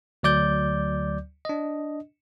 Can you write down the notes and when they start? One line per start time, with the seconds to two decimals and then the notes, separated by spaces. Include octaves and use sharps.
0.23 D2 F#3 D5 D6 G6
1.45 D4 D#5